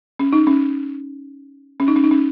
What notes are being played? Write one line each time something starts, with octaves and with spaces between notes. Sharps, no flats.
C#4
D#4
C#4
C#4
D#4
C#4
D#4
C#4